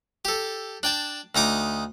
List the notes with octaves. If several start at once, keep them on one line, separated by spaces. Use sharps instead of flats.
G4 A4
D4 G5 A5
D2 D#4 D#5 D6